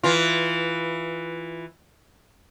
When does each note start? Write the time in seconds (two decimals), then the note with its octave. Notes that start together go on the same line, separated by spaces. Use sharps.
0.03 E3 F4